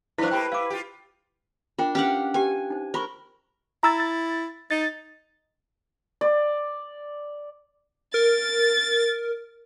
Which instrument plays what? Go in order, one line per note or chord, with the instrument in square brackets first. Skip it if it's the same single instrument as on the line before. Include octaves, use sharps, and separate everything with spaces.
[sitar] F#2 F3 [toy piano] E4 C5 [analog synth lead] B4
[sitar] A3 A#3 G4 [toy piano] G5 B5
[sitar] E4 [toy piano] F5 D6
[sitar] F4 G4
[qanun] D4 [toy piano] F4 A#4 G5
[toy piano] C#4 B4 [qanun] G4 F5 F#5
[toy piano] G4 B4 G5 [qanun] G#5
[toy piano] D#4 C5
[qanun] A#4 [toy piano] C5 B5 C#6
[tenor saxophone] E4 [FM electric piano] A#5 E6 A6
[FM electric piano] A6
[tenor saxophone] D#4 [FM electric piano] A6
[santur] D5
[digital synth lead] A#4 [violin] A6